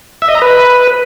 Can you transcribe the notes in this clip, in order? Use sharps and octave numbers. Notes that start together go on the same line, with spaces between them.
E5
D#5
A#5
B4